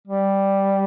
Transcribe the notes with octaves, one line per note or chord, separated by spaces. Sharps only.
G3